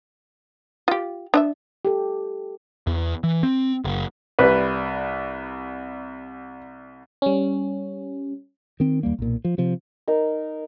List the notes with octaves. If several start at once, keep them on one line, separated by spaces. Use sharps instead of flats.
F4 G4
D4 D#5 E5
G4 A4
E2
E3
C4
F#1
C2 G3 B4
G3 C#4
D#3 C4
D#2 G3 A#3
B1 A#2
F3
C3 F3
D#4 A#4